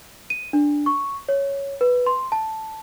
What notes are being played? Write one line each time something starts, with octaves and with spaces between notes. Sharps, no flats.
D#7
D4
C#6
C#5
B4
C6
A5